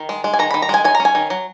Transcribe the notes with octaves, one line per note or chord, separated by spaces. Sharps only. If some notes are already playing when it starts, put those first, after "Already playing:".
Already playing: D#3
G#3
G#3
G#5
D#3 A#5
D#3 B5
A#5
G#3 G#5
F#3 G#5
A#5
C#4
G#5
D#3
F#3